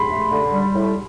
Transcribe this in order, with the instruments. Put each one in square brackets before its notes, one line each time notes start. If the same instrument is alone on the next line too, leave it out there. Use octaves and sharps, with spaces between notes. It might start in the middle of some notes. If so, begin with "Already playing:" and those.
Already playing: [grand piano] B5 C6
[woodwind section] A3
D3
G3
A2